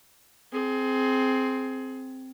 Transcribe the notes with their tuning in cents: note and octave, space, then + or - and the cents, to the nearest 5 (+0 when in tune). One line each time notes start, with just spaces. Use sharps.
C4 +0 G#4 +25